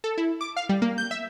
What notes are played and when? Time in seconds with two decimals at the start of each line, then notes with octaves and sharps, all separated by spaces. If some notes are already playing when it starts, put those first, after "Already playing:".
0.04 A4
0.18 E4
0.41 D6
0.56 F5
0.69 G3
0.82 A#3
0.98 G6
1.11 E5